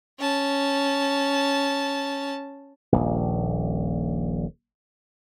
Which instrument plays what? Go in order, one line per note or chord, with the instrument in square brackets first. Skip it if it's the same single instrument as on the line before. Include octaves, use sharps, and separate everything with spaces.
[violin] C#4 A5
[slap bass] D#1 A#1